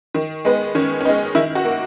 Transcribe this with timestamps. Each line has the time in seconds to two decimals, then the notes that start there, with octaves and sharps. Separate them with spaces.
0.15 D#3
0.45 G#3 B3
0.75 D#3 C#4
1.00 C#4
1.05 G#3 B3 D#4
1.35 D#3 E4
1.55 F#4
1.65 A#3